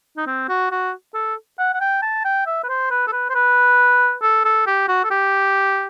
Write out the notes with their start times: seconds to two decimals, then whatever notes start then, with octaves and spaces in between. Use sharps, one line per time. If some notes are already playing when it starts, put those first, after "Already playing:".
0.17 D#4
0.27 C4
0.49 F#4
0.71 F#4
1.15 A4
1.59 F#5
1.74 F#5
1.81 G5
2.02 A5
2.25 G5
2.46 E5
2.64 B4
2.69 C5
2.90 B4
3.07 A4
3.12 B4
3.30 C5
3.35 B4
4.23 A4
4.45 A4
4.67 G4
4.88 F#4
5.04 A4
5.11 G4